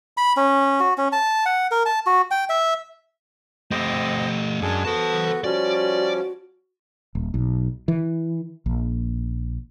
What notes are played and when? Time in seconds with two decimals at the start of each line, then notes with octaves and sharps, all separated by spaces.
0.17 B5
0.37 C#4
0.80 F#4
0.98 C#4
1.12 A5
1.46 F#5
1.71 A#4
1.86 A5
2.06 F#4
2.31 G5
2.49 E5
3.71 A3 C4 G4 C5 D#5
4.62 F#2 F#3 G#3 D4 G#4
4.85 B3 F#4 A4 C5 A5
5.44 F3 G3 C#4 F#4 D5
7.15 D#1
7.34 B1
7.88 E3
8.66 A#1